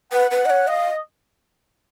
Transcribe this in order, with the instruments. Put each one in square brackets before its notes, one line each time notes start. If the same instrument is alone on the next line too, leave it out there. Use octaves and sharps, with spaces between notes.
[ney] B4 [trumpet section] F#5
[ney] B4
D#5
C#5
[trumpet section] D#5 [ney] F5